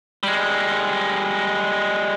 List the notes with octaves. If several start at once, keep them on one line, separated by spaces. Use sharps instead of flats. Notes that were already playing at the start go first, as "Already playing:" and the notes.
G3 G#3